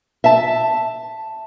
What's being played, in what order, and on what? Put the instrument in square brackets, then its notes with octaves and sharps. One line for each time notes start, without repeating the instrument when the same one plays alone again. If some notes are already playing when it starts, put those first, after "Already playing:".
[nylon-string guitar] E5 A5